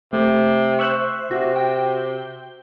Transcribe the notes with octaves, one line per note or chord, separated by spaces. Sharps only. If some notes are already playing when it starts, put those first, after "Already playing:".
C3 A3
C5 E5 C#6 E6 F#6
C3 F#4
G5